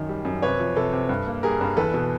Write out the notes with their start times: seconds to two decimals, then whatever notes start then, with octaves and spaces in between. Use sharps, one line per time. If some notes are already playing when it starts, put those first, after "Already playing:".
Already playing: F#2 D#3
0.09 G3
0.25 F#2
0.42 C3 B4 C#5
0.59 F3
0.76 C3 A4 B4
0.93 C3
1.09 G2
1.26 A#3
1.43 G3 G#4 A#4
1.61 G2
1.77 E2 A4 B4
1.94 B2